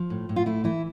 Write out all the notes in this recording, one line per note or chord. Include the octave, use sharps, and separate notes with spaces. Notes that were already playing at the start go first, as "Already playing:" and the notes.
Already playing: F3
A2
A2
F4
A3 E4
E3 E4